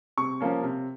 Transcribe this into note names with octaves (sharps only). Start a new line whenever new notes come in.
C3 C#6
F3 A#3 C#4
C3